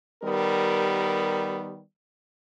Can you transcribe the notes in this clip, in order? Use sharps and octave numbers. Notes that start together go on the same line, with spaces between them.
D#3 G3 B3 G4 A#4